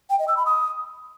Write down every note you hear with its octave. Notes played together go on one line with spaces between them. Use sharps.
G5
D#5
E6
B5
D#6